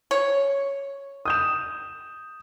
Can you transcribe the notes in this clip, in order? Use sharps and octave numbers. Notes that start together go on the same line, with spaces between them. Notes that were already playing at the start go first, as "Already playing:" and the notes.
C#5
D#6 G6 E7